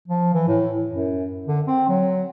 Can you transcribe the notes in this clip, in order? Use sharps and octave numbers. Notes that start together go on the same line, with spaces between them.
F3
E3
A2
F#2
D3
C4
F#3